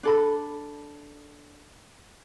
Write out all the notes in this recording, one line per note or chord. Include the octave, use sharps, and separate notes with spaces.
D4 A4 B5